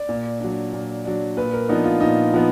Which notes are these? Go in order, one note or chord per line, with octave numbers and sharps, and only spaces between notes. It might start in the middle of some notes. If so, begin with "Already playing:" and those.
Already playing: D5
A#2
F#3 D4
A#2
F#3 D4
A#2 B4
A#4
F3 B3 D4 D#4
F4
A#2 D#4
F3 B3